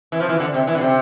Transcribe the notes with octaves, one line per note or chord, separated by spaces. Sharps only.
E3
F3
E3
D3
C3
E3
D3
C3